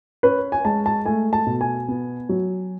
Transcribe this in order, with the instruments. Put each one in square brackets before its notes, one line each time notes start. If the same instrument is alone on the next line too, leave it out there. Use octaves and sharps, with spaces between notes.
[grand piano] C#4 B4
G#5
G#3 A5
A5
A3 G#5
A5
B2
G#5
B3
F#3